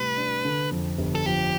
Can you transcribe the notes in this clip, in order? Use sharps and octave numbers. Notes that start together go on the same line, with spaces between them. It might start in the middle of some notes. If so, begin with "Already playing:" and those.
Already playing: A2 C3 G3 B4
D4
D3
F2
G1
A4
F3 G4